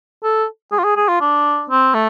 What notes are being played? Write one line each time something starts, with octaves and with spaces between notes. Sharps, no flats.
A4
G#4
F4
G#4
G#4
F4
D4
C4
A3